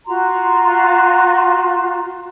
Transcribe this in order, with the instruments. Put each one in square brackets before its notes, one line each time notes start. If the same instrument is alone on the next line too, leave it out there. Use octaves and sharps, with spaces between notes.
[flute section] F4 F#4 A#5 C6